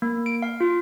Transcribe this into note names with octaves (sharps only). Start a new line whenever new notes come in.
A#3
D7
F5
F4